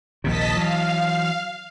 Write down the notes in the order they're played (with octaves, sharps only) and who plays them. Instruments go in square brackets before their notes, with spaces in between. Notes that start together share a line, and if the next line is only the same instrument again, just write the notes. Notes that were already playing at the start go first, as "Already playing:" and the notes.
[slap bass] A#1 D#2 C3 [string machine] D#5 A5 B6
[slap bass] E3 F#3 [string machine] F5